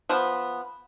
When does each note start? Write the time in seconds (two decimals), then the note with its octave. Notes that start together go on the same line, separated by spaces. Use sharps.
0.09 F3 B3